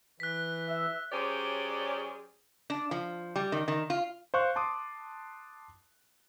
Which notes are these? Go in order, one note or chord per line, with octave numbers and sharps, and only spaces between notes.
E3 F#6 B6
E5
F#3 C#4 G4 G#4 C5 D5
D4
F3
G3
D#3
D#3
F4
C5 F5 C#6 F#6
A5 C6 D6 D#6